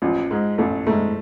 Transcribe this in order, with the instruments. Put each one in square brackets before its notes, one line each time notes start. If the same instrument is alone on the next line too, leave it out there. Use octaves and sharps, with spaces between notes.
[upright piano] A1 [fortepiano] F3
[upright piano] G#2 G#3
[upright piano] A1 [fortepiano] A3
[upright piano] G#2 G#3 [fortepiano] A3